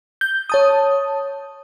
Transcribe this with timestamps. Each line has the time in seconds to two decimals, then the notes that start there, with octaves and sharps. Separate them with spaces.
0.21 G6
0.50 C#5 A5 D#6